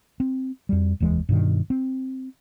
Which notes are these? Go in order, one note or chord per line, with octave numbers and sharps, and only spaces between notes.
C4
F2 G3
F1 D#2 E3 G#3
G2 B2 D#3
C4